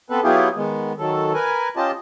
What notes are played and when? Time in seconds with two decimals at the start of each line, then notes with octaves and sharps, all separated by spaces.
0.10 B3 C4 A4 B4
0.24 F#3 B3 E4 F4 G4 G#4
0.56 D#3 G#3 B3
0.98 D#3 F#3 A4
1.34 A#4 B4 G#5
1.77 C#4 F4 G4 D#5 A5